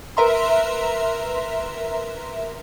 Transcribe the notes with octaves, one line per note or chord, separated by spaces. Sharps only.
A#4 B4 E5 A#5 C6